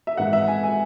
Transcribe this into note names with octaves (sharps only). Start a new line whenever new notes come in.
E5
G#1 G#2 E3 F#5
E5
G#5
G#5